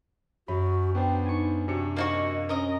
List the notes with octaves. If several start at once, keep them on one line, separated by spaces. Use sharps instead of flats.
F#2 F#4 B5
B3 D4 C5 G5
D#4 G#5 C#6
C3 D4 F#4 C#7
A#3 D#4 F#4 D#5
C#4 A#4 D#5